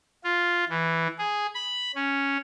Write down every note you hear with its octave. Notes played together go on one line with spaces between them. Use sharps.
F4
E3
G#4
B5
C#4